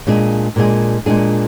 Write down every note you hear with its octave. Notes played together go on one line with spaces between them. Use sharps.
A#2 G#3 D4 G#4
A#2 G#3 D4 G#4
A#2 G#3 D4 G#4